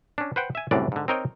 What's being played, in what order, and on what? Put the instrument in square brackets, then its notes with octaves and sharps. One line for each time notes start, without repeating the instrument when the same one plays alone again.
[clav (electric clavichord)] C#4 D4
B4 C5 F#5 G5
E5 G#5
C2 F#2 A2 E3 D4 D5
G#2 D3
C4 D#4 A#4 C#5 D#5 G5